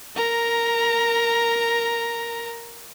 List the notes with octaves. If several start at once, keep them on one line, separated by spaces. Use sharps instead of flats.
A#4 A#5